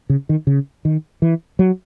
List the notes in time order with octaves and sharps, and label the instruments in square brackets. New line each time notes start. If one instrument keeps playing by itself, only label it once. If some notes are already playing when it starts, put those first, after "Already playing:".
[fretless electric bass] C#3
D#3
C#3
D#3
E3
F#3